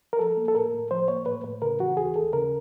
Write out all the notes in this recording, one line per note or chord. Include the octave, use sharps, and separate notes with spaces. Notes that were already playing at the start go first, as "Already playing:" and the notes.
A#4
F3 A4
A#3
A4
A2 A#4
A2
F3 C5
A#3 C#5
A2 B4
A2 B4
C#3 A#4
E3 F#4
D#2 G#4
D#2 A4
C#3 A#4